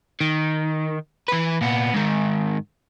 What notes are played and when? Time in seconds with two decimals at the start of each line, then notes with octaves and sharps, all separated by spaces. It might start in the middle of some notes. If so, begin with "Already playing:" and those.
0.21 D#3
1.28 E3 B4
1.61 A#2 B3
1.94 G#2 D#3